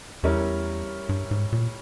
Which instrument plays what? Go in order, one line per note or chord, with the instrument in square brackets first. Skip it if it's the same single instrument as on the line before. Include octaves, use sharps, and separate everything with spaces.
[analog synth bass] E2 [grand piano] G3 C#4 E4 A#4
[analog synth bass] G2
G#2
A#2